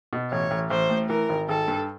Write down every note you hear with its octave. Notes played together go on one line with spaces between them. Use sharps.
B2
A1 C#5
A1
A1 C5
A2
E3 A#4
G#1
G#1 A4
G2